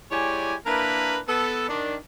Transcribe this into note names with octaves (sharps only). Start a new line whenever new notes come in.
G#3 E4 G4 C#5 D5 G#5
A#3 D4 E4 A#4 B4
B3 A4
D#3 D4